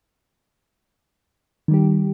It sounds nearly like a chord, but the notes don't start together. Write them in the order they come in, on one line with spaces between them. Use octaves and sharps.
D#3 G3 G4